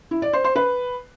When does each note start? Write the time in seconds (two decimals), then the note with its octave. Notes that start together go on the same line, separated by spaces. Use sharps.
0.11 E4
0.22 D5
0.33 C5
0.44 C5
0.56 B4